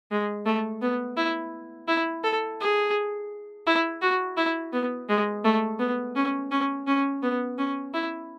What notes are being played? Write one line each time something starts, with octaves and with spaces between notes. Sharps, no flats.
G#3
A3
B3
E4
E4
A4
G#4
E4
F#4
E4
B3
G#3
A3
B3
C#4
C#4
C#4
B3
C#4
E4